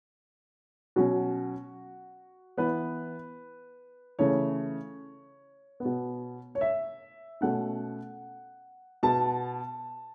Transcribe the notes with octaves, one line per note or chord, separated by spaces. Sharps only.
B2 F#3 C#4 F#4
E3 B3 B4
C#3 E3 A3 C#5
B2 B3
C#5
E5
B2 A3 C#4 F#5
B2 B3 A5